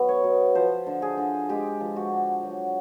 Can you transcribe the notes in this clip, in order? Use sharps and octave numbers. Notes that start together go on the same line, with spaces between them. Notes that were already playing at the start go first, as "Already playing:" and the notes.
Already playing: F#3 B3
C#5
B2
F3 C5
D3
G#4
D3
G#3 G4
F3
F#4
D3
F#3